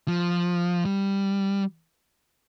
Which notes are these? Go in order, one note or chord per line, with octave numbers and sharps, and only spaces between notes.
F3
G3